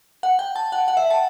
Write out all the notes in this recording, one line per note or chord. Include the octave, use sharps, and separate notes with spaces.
F#5
G5
A5
F#5
F#5
E5
A5